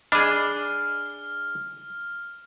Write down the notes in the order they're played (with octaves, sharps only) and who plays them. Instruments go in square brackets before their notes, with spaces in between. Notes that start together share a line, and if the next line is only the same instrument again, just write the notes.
[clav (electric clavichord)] D4 G#4 [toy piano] D#5 B5 D6 [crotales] F6